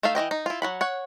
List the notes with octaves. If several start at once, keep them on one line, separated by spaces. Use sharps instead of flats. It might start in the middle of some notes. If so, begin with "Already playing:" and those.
A3 D#4 A4 E5 F5
E3 E4 D#5 G5
D#4
E4 F4
F#3 F#5 B5
C#5 F#5